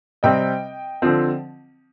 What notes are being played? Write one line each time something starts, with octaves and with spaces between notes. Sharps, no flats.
C3 G3 C4 D#5 G5
D3 F3 C4